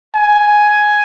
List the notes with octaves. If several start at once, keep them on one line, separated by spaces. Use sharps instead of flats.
G#5